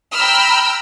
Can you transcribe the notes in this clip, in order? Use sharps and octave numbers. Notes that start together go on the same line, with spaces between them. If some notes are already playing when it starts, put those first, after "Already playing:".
G5 A#5 B5 E6 F6